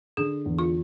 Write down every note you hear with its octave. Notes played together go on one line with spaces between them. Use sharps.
D3 G#4
E2
F4